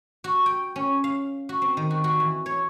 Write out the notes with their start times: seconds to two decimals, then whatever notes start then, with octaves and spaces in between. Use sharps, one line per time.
0.24 F#4
0.46 G5
0.76 C#4
1.04 F5
1.49 F#4
1.62 C4
1.77 D#3
1.90 F#4
2.04 F#4
2.20 E3
2.46 C#5